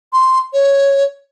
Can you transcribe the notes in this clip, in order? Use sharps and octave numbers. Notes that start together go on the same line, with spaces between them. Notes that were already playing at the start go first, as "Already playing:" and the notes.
C6
C#5